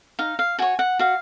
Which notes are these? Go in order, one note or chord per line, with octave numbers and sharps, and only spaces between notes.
D#4 F5
F5
F#4 C#5 G#5
F#5
F#4 F5